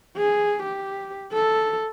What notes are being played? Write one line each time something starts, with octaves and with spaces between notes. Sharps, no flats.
G#4
G4
A4